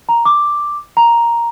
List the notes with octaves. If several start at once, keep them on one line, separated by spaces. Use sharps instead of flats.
A#5
D6
A#5